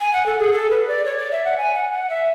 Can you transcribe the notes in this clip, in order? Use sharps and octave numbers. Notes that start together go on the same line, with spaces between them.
G#5
F#5
A4
G#4
A4
B4
D5
C#5
D5
E5
F#5
G#5
F#5
F#5
E5